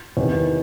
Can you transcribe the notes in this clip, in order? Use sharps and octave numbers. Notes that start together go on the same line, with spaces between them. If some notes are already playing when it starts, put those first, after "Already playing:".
E2 C3 D#3